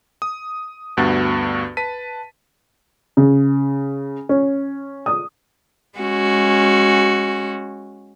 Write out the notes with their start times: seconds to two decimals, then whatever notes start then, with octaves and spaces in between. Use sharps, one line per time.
0.22 D#6
0.97 D2 G2 B3 F#4 A6
1.77 B4 A5 B6 D#7
3.17 C#3
4.29 C#4
5.06 D#6
5.99 G#3 C#4 F#4